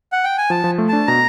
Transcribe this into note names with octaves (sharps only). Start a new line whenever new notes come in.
F#5
G5
G#5
F3 A5
F3
A3
D4 A5
B2 A#5